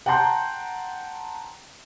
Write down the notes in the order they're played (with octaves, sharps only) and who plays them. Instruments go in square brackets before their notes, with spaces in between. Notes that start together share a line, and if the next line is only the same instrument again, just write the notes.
[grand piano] F#5 G5 A5 A#5 C6 G6